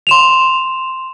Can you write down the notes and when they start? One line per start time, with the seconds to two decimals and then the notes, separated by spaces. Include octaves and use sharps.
0.07 C6 E7 F7